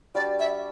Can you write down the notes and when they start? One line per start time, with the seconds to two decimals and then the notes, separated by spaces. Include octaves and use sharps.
0.15 G3 D4 F#4 B4 D5
0.39 E5